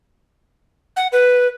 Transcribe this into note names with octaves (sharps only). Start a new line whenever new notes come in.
F#5
B4